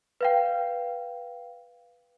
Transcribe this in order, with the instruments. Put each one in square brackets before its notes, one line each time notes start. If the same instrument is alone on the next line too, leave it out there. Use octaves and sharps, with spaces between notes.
[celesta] B4 F5 G5